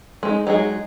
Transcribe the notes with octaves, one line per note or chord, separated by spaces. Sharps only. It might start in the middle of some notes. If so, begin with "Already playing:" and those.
G#3 D#4
F#3 G#3 D#4 G#4